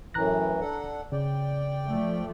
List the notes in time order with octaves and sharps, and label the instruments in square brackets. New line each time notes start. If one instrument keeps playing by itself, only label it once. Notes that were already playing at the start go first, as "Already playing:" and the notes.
[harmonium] F#2 A2 E3 [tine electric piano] A#5 F#6 A#6
[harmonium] D4 A4 F#5
[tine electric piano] C#3 [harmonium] D5 G5
[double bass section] F3 A3